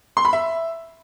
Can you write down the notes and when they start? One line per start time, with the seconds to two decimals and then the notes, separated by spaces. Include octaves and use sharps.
0.17 C6
0.25 B5
0.33 E5